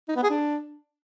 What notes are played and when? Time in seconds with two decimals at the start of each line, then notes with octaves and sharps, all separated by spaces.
0.08 D#4
0.16 B3
0.23 G#4
0.30 D4